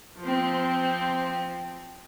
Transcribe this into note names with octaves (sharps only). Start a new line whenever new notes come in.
F3 C4